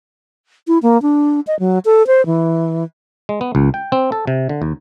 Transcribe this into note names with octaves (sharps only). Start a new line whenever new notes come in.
E4
A#3
D4
D#5
F#3
A4
C5
E3
G#3
B3
C#2
G5
C4
A4
C3
D3
D#2